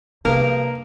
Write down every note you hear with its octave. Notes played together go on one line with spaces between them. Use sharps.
G2 C3 F3 G#3 A#3 D#4 A#4